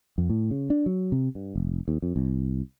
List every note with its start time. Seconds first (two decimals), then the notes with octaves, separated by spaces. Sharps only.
0.18 F2
0.30 A2
0.51 C#3
0.70 D4
0.86 F#3
1.12 C3
1.35 G2
1.55 F1
1.88 D#2
2.02 F2
2.16 C2